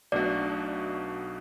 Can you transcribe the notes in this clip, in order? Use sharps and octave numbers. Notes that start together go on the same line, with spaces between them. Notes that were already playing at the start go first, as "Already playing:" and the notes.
B1 B2 A3 D4 F#4 D5